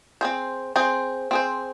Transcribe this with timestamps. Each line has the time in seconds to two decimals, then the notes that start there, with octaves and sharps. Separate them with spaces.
0.21 C4 G#4 C5
0.76 C4 G#4 C5
1.31 C4 G#4 C5